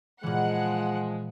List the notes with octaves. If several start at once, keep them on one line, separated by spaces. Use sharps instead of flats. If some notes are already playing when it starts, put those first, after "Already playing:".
A#2 E3 F3 G#3 F#5